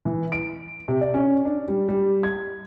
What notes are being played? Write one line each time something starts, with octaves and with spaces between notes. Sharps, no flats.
E3
D7
C3
D5
C#4
D4
G3
G3
G#6